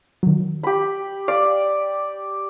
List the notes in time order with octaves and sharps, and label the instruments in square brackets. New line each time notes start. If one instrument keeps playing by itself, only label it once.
[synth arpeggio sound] D#3 F#3
[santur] G4 B5
[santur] D5 [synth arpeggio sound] F5